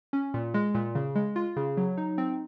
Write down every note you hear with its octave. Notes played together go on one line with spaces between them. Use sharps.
C#4
A#2
G#3
A#2
C#3
G#3
F4
C#3
F#3
D#4
C4